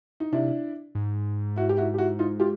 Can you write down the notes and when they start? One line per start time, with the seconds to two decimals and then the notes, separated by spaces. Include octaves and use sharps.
0.20 D#4
0.32 C3 D4 E4
0.95 G#2
1.56 E4 F#4
1.69 G4
1.77 E4 F#4
1.94 G4
1.98 E4 F#4
2.19 D#4 F4
2.40 F4 G4